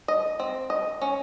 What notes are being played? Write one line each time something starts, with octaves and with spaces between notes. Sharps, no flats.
D#5
C4
D#5
C#4